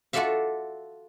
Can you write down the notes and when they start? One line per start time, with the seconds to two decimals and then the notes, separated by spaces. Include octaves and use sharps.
0.13 F4 F#4 A4 D5 E5 F5